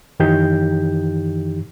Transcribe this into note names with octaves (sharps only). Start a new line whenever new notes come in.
F#2 D#3 E3 D#4 G4 G6